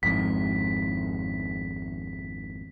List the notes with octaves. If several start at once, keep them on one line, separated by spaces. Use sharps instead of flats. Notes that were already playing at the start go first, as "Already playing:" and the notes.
G#1 F2 G#2 B6